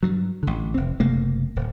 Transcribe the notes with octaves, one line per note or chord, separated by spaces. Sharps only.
G2 F#3
A1 D3
F1 C4
F#1 C3 A3 A#3
D1